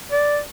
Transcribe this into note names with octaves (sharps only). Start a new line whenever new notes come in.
D5